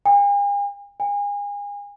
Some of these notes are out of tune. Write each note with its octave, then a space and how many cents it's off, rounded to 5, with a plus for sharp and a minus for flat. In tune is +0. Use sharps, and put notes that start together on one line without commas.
G#5 -45
G#5 -35